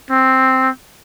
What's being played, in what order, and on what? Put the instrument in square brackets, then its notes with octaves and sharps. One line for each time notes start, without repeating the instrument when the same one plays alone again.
[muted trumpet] C4